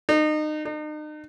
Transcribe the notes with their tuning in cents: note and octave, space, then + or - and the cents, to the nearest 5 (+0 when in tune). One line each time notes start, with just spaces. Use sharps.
D#4 -30
D#4 -40